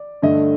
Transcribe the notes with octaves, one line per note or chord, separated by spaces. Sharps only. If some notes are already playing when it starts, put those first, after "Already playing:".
Already playing: D5
G2 D3 A3 D#5